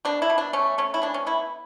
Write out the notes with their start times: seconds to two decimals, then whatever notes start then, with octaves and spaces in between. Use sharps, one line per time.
0.05 B2 D4
0.22 E4
0.30 B2
0.38 D4
0.53 A3 C#4
0.78 A3 C#4
0.94 E4
1.02 E3 D4
1.14 C#4
1.26 B3 E4